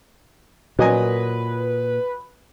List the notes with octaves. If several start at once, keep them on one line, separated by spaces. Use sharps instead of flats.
A#2 F#3 B4 D#5 G#5